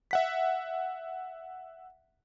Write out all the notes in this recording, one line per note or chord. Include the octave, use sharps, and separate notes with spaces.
E5 F#5 B6